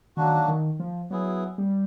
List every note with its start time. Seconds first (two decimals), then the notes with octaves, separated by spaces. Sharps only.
0.17 D#3 F#3 A#3 D4 F#4
0.48 D#3
0.80 F3
1.11 F#3 B3 E4 G#4
1.58 G3